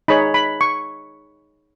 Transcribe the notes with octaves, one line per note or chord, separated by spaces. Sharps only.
D#4 G#4 C#5 B5
B5
C#6